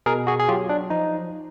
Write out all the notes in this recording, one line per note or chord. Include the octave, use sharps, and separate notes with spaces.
B2 G#4 A#4
F#4 G#4
G#4
F#3 F4 G4
D4
F3 D#4